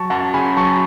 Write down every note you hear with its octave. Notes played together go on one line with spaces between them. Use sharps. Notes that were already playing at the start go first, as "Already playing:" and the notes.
Already playing: F#3 A5 C#6
F#2 F#5 A5
C#3 G#5 B5
F#3 A5 C#6